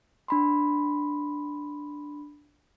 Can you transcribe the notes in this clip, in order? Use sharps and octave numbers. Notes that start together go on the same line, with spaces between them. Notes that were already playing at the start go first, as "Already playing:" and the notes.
D4 B5 C6